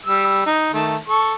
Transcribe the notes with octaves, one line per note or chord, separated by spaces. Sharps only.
G3 E6
D#4
D#3 A3 A5
A4 C#6